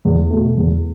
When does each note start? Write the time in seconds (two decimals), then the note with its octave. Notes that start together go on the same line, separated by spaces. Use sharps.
0.05 E2
0.30 B2 A3
0.57 E2